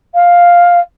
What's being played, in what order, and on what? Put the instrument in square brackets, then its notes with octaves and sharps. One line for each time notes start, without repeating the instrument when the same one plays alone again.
[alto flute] F5